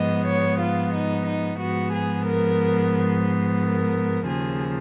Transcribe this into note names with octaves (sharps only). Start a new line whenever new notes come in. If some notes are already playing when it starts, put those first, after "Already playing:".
Already playing: G#2 F3 B3 D#5
C#5
F4
D#4
D#4
G#2 F3 B3 F#4
G#4
A#4
A#4
D#2 C#3 F3 G#4